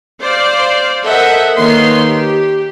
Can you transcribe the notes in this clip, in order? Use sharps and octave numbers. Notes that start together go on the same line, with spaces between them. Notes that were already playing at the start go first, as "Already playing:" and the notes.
C5 D5 F5
A4 A#4 C5 D#5 E5 F#5
D#3 A#3 B4 C#5 C6
G4